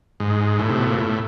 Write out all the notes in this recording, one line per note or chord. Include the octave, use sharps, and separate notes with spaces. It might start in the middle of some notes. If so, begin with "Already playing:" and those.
G#2
A2
C3
B2
A#2
A2